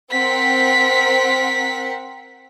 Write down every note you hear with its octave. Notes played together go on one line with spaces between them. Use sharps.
C4 A#4 F#5 B6